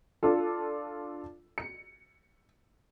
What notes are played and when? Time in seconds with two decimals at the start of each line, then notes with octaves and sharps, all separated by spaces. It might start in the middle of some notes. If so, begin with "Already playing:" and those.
0.23 D4 F4 A4
1.58 C#7